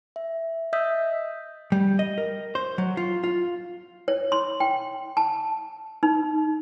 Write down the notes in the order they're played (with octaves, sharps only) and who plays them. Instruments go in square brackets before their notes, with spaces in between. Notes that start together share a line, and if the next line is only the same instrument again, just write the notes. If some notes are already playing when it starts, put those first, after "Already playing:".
[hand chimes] E5
D#5 E5 D#6 E6 G6 B6
[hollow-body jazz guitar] G3
D#5
A#4
C5
F#3
F4
F4
[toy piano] C#5
C6
G5
A5
D#4